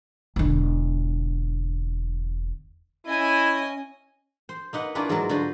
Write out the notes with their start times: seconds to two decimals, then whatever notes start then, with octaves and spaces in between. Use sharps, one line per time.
0.36 E1 D3
3.07 C#4 E4 D#5 G#5
4.49 C5
4.73 A#3 D#4 B4 F#5
4.95 A#3 C#4 D4 E4 F4 B4
5.09 G#2 F#3 B3 A#4 A5
5.29 D3 F4 F#4 B4 C5